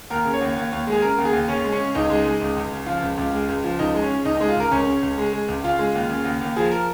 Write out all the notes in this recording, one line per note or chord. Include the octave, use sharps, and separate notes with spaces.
D#2 A#4
C#3
C#5
D#2
D#2
D#2
G#3
G#4
C#3 A#4
D#2
G#4
D#2
C#3 C#4
G#3
C#4
C#3
C#2 D#4
G#3
G#3
C#2
C#2
C#3
F3 F4
C#2
C#2
G#3
C#2
F3
C#2 D#4
G#3
C#4
C#3
C#2 D#4
D#4
G#3
F4
C#2 A#4
C#2 C#4
C#3
C#2
G#3
G#3
C#2
C#3 F4
G#3
D#2
C#3
D#2
D#2
F3 G#4
A#4